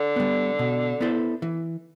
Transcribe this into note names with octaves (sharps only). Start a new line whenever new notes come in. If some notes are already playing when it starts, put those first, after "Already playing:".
Already playing: D3
G3 B3
B2
B3 E4 A4 C5
E3